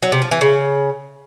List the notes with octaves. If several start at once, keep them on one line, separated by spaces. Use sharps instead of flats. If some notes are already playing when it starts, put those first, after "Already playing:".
F#3
C3
F3
E3
C#3